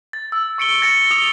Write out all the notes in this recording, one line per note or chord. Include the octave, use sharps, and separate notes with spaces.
A6
E6
C#6 C#7 D7 G7
A6 A#6 C#7
D#6 C#7 F7 G7